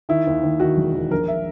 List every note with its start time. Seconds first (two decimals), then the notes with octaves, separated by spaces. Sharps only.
0.09 D#3 E4
0.27 D#2
0.43 D#2
0.60 D#3 F#4
0.77 E1
0.94 D#3
1.11 A#1 A#4
1.28 E5